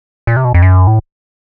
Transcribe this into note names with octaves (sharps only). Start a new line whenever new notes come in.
A#2
C3
B2
F2
F#2
A2